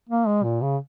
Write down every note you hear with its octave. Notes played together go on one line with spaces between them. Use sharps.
A#3
G#3
A#2
C#3